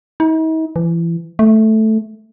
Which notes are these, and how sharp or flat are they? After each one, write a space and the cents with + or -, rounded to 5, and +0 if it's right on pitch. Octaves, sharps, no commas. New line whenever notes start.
D#4 +45
E3 +30
A3 -5